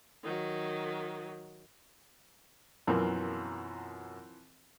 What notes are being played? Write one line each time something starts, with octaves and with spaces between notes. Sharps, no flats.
D#3 F#3
F#2 B2 E3 F3 C4 A#4